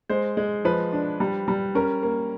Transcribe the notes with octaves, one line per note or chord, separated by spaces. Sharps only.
G#3 C5
G#3
F3 B4
D4
G3
G3
C#4 A#4
A#3